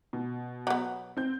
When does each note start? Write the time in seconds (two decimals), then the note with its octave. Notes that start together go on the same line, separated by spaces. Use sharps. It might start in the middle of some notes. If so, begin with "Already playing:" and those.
0.13 B2
0.67 F#3 B3
1.17 C4 G6